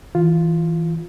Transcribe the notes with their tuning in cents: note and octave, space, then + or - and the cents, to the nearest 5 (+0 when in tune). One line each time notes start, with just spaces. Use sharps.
E3 -10 F4 +0